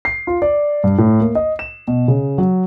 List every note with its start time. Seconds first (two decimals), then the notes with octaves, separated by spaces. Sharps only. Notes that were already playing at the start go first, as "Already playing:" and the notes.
0.05 C7
0.27 F4
0.42 D5
0.84 G2
0.98 A2
1.20 A#3
1.35 D#5
1.59 E7
1.88 B2
2.08 C#3
2.38 F#3